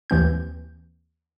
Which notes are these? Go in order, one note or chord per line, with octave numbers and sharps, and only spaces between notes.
D#2 E3 C4 G6